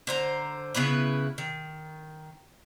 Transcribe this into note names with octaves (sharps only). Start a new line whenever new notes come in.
D3 C5 A#5
C#3 B3 E4 B4
D#3